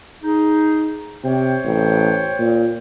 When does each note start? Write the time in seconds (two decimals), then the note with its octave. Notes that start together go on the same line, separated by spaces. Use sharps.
0.22 D#4 G#4
1.24 C3 C5 C#5 G5
1.65 A1
2.39 A#2